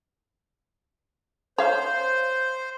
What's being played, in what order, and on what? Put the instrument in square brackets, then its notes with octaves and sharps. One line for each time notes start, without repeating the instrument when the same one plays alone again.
[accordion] C5 [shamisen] C#5 F5